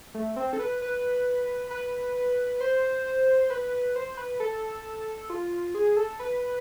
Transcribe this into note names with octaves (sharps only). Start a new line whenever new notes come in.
A3
C4
A4
B4
B4
B4
C5
B4
C5
B4
A4
F4
G#4
A4
B4